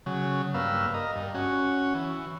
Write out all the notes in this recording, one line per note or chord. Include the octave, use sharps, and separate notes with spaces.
C#3 F#3
G2 A#3 B4 F5 E6
A#4 D#5
G2
C#4 F#4
E3